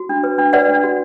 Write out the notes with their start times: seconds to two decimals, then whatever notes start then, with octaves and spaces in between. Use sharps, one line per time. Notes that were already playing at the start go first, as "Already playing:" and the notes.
Already playing: F#4
0.09 D4
0.23 B4
0.38 D4
0.53 B4 D5 F#5
0.69 D4
0.84 F#4